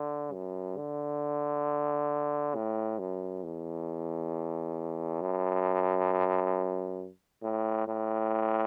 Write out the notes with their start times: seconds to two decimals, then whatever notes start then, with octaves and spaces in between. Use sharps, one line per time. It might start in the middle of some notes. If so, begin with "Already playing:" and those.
Already playing: D3
0.33 F#2
0.77 D3
2.55 A2
2.99 F#2
3.44 E2
5.22 F#2
7.43 A2
7.88 A2